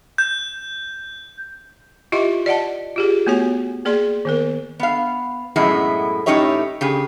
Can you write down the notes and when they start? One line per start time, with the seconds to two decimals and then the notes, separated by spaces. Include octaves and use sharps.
0.18 G6
2.12 E4 F4 G4 D#5 E5 C6
2.46 D5 D#5 F#5 A5
2.96 F4 G4 G#4
3.27 A3 B3 F#4 C#5 G#5
3.85 A#3 G#4 D5 C6
4.25 D#3 B3 A#4
4.80 B3 F5
5.56 F#2 A2 G#3 B3 E4
6.26 A2 C#4 D#4 G4 C#5 E5
6.81 C#3 G4 G#4